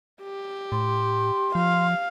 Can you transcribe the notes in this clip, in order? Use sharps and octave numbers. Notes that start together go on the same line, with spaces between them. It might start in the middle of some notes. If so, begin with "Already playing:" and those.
G4
A2 C6
F3 F5